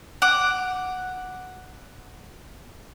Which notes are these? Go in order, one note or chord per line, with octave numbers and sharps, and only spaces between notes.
F#5 D6